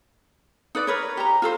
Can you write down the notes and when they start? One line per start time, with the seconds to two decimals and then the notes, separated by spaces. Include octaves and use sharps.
0.75 D#4 B4 D5
0.87 A#4 B4 C#5
1.17 G4 A#5
1.42 F4 A4 C5